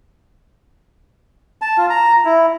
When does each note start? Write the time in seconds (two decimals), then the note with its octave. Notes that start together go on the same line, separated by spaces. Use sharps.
1.62 A5
1.78 F4
1.90 A#5
2.25 E4